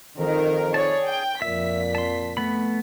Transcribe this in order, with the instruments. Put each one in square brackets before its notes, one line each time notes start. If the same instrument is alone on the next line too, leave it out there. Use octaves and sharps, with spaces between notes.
[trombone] F2 [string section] D#3 A#4
[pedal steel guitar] G#4 D5 A5 [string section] C#5
[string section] G5
[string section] F2 B6 [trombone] A#2 [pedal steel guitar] E5
[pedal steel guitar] A5 C6
A3 B3 B5